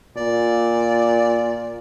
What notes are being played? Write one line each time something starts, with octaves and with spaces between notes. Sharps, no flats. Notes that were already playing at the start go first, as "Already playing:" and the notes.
A#2 D5